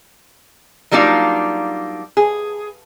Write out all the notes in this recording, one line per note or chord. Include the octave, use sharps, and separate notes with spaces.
F#3 G3 A#3 D4 D#4 F4
G#4